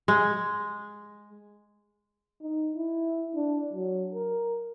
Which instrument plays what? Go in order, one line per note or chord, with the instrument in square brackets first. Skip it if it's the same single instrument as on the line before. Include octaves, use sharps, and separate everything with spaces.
[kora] G#3
[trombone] D#4
E4
D4
F#3
A#4